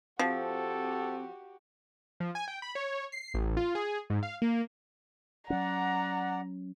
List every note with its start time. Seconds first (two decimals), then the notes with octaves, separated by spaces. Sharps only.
0.19 F3 C4 F#4 G4 A4
2.20 F3
2.35 G#5
2.48 G5
2.62 B5
2.75 C#5
3.12 C7
3.34 A1
3.57 F4
3.75 G#4
4.10 G#2
4.23 F5
4.42 A#3
5.50 F#3 C#4 D5 F#5 A#5